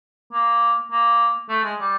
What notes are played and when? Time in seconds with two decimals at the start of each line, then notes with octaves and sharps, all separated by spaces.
0.33 A#3
0.91 A#3
1.49 A3
1.64 G#3
1.79 G3